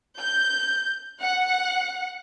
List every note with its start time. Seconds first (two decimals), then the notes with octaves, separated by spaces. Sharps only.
0.19 G6
1.20 F#5